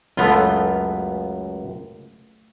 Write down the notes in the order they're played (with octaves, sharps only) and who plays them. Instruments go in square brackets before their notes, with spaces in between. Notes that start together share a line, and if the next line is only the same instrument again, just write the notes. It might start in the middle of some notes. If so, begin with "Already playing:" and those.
[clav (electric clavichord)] C#2 F#2 [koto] A3 B3 F4